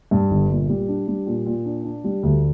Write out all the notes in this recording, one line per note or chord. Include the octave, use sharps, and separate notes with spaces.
G2
G1
A#2
G3
D4
G3
A#2
A#2
D4
D4
G3
D2